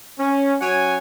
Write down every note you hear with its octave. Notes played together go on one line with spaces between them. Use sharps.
C#4
F#3 C#4 C#5 F#5 G#5